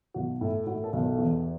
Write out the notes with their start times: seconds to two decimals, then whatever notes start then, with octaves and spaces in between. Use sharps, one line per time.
0.14 B1 F#4
0.41 A2
0.67 A2 F#4
0.84 A4
0.93 B1
1.02 A4
1.18 E2